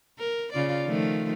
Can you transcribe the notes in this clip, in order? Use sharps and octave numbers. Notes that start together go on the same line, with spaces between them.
A#4
C#3 F4 D5
D#3 F3 A3